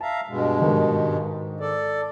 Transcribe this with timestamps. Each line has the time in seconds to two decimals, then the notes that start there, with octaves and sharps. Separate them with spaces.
0.01 E5 F5 A5 A#5
0.28 G2 B2 G#3
0.62 G#2 D#3
1.60 A4 D5